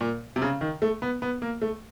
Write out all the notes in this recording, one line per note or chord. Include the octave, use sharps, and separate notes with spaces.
A#2
C3
C#3
D#3
A3
B3
B3
A#3
A3